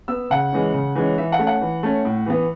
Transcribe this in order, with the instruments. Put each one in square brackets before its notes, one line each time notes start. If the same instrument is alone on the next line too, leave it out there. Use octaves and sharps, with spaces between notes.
[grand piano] B3 E6
C#3 F#5
E3 G#3 C#4
C#3
E3 G#3 C#4
E3 E5
F#5
A3 C#4
F#5
E3
A3 C#4
A2
E3 B3